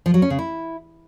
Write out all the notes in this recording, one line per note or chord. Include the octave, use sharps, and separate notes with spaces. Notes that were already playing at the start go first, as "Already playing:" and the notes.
F3
F#3
C#4
C#3
E4